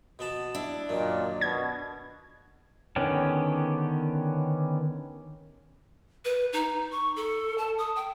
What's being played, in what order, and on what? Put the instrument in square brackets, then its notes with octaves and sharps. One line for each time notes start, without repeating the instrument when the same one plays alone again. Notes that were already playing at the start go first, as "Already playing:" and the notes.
[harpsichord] B2 B3 A5
[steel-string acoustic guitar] D4 [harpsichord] E4
[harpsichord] F#2 D#3 [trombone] A#2
[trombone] B2 [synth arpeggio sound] G#6
[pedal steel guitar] D3 D#3 B3 C#4 G4
[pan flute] B4
D#4
C#6
A4
A5
D#6
G5